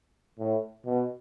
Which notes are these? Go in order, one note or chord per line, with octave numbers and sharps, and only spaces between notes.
A2
B2